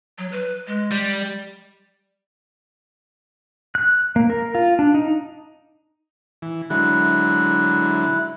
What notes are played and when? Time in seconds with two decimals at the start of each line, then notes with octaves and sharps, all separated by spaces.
0.18 F#3
0.32 B4
0.67 G#3
0.91 G3
3.75 F#6
4.16 A#3
4.30 A#4
4.55 F4
4.79 D4
4.94 D#4
6.42 E3
6.70 D3 F#3 G#3 E4 F#6